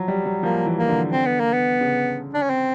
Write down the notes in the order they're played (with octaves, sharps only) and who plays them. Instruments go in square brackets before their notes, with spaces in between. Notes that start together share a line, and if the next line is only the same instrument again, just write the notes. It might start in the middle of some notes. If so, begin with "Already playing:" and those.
Already playing: [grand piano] F3 F#3
G3
F#3
[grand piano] F3 [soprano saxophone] A#3
[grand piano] E3
[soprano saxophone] A#3
[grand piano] D3
[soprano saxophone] C4
B3
A#3
B3
[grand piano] C#3
[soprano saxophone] D4
C#4
C4